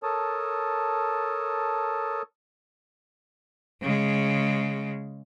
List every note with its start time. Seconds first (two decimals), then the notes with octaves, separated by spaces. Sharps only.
0.03 A4 A#4 C#5 A5 D#6
3.81 C#3 G#3